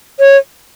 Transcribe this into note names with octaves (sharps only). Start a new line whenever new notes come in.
C#5